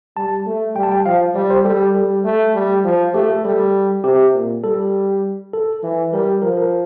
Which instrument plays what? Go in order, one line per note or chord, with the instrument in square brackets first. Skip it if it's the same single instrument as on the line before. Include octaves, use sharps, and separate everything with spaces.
[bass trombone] G3 [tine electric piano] A5
[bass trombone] A3
[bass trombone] G3 [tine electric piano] G5
[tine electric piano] A5
G5
[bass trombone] F3 [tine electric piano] F5
[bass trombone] G3 [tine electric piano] D5
[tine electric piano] C5
[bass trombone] G3 [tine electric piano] A4
[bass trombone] G3 [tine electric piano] A4
[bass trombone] A3
G3
F3
[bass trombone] A3 [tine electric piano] G4
[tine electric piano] A4
[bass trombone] G3 [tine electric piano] A4
[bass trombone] C3 [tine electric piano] G4
[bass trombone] A#2
[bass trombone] G3 [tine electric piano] A4
[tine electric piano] A4
[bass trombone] E3
[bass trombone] G3 [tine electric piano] A#4
[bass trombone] F3 [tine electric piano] A#4
[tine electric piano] A#4